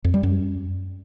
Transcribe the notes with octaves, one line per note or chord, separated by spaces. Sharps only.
F2
G3
F#2